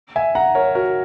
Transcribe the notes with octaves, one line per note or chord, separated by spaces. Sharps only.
E5 G#5
F#5 A#5
A#4 C#5
F#4 A#4